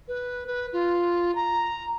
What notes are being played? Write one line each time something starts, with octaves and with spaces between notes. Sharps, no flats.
B4
B4
F4
A#5